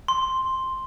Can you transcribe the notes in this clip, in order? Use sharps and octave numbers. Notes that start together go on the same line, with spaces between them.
C6